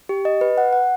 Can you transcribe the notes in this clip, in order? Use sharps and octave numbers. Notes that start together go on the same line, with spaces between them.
G4
D#5
B4
F#5
F#5